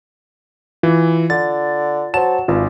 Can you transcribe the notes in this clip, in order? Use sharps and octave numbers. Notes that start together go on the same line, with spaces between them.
E3 F4
D3 A6
F#3 C5 A5 E7
G#1 G2 F4